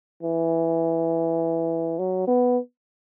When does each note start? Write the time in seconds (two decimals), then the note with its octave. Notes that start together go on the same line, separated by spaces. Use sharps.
0.23 E3
1.99 F#3
2.27 B3